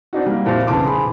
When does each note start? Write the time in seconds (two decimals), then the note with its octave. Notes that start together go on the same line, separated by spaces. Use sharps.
0.13 C4 D4 D#4 F#4
0.26 G3 A#3
0.45 F2 A#2 F3 E4 C5
0.67 B1 E2 C#3 A5 C6 D6
0.84 G#4 B5